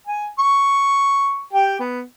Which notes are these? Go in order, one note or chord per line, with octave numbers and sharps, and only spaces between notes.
G#5
C#6
G4 G5
B3